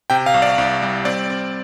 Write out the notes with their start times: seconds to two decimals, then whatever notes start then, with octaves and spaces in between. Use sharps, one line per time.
0.10 C3 G5
0.26 F5
0.34 C2
0.42 D5
0.58 C2
0.82 G3
1.05 C4 D5
1.30 C4